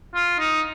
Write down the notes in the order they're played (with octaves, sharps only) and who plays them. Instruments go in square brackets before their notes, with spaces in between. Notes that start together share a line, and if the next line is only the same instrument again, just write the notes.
[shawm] F4
D#4